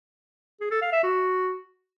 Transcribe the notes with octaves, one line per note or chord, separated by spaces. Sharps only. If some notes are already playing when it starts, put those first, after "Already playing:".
G#4
A4
F5
E5
F#4